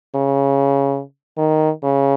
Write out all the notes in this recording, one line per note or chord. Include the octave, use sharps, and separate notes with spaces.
C#3
D#3
C#3